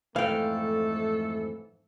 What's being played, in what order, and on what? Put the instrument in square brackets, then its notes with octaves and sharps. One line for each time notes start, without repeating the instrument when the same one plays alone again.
[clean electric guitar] F2 G#2 E3 [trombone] A3 [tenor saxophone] A4 [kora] F5 G5